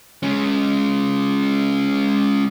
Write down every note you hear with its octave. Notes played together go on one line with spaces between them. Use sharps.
G#3 C#4